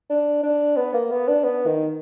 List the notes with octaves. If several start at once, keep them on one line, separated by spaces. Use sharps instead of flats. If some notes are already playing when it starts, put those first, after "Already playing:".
D4
D4
B3
A#3
B3
D4
B3
D#3